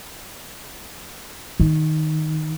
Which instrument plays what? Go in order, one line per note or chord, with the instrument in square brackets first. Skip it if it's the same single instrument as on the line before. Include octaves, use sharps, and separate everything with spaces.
[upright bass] D#3